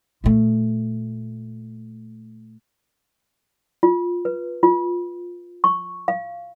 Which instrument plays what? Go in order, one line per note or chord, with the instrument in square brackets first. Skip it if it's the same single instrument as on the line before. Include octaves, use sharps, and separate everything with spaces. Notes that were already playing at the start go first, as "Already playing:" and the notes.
[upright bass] A#2 A3
[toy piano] F4
B4
F4
C#6
F5